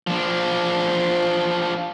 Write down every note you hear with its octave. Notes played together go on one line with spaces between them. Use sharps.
F3 D4